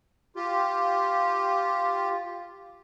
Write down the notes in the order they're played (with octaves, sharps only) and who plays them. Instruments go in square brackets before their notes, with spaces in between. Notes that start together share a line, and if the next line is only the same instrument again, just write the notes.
[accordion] F4 G4